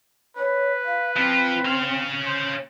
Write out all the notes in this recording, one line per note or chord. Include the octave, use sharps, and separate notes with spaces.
B4 C#5
F5
F3 C4 F4
C#4 F5
C5